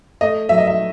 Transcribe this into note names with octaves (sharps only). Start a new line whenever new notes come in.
A3 D#5
F#3 E5
D#5
E5